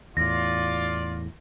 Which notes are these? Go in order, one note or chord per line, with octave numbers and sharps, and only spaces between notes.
E2 A2 F4 D5 A#6